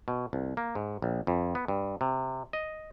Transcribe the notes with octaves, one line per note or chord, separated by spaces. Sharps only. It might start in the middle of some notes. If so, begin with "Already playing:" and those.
B2
C2
A#3
G#2
A#1
F2
B3
G2
C3
D#5